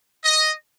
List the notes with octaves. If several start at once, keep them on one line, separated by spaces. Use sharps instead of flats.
D#5